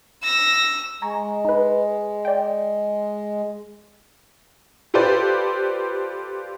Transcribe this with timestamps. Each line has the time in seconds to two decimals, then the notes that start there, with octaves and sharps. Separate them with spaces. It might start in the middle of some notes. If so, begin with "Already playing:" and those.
0.23 E6 A#6
1.02 G#3 G#5 A#5 C#6
1.45 D#4 B4
2.25 D5 G5
4.94 F4 G4 A4 B4 C5 D5